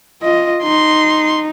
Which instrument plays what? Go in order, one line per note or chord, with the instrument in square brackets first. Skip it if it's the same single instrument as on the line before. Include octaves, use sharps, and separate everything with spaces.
[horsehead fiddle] F4 D#5
[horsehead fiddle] D#4 [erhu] C6